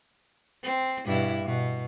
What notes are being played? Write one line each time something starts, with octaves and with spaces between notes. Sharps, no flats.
C4
G2 B2 E4
B2